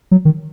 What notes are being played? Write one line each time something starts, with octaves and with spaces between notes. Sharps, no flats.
F#3
D#3